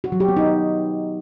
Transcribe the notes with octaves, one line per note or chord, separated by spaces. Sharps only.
F#4
F#3
G4
B3
D#4